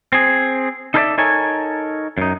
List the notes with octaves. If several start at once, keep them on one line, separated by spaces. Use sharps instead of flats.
C4 G#4
D#4 A4 A#4 C5 D5 E5
D#4 A4 A#4 C#5 G#5
F#2 D#4